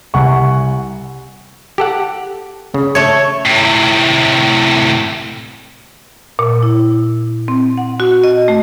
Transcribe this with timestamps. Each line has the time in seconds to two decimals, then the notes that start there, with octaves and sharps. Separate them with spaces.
0.14 C2 F#5 G#5 C#6
1.78 G4 A4 F#5
2.74 C#3
2.95 A3 C#5
3.46 A2 C3
6.39 A#2
6.63 E4
7.48 C4
7.78 F#5
8.00 F#4
8.24 D#5
8.48 A3